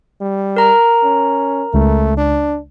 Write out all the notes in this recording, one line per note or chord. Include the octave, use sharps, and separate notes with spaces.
G3
A#4 A#5
C#4
C#2 A3
D4